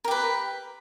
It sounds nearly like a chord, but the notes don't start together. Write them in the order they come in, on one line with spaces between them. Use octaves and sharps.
A#4 G4 B4